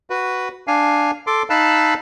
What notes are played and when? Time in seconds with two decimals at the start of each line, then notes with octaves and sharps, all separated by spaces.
0.10 F#4 B4
0.67 D4 F5 G#5
1.27 A4 C6 D6
1.50 D#4 F5 A5 B5 E6 F#6